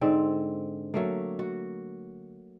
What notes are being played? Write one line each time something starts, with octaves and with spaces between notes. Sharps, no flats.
G#2 D3 C4
F#3 A3 A#3
F#4